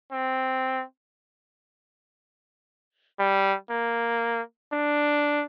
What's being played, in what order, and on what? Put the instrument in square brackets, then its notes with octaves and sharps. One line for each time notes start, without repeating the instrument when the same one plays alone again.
[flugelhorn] C4
G3
A#3
D4